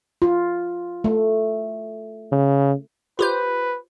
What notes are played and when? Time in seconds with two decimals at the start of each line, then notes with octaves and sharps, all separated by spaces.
0.22 F4
1.04 A3
2.32 C#3
3.19 F4 G4 B4 C5